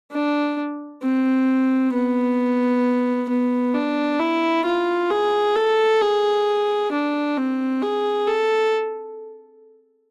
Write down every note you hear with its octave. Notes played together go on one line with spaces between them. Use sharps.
D4
C4
B3
B3
D4
E4
F4
G#4
A4
G#4
D4
C4
G#4
A4